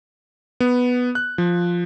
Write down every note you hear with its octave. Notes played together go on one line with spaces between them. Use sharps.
B3
F#6
F3